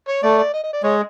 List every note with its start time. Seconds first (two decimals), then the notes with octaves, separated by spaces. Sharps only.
0.08 C#5
0.23 A3 D5
0.38 D5
0.53 D#5
0.64 D#5
0.73 D5
0.83 G#3 C#5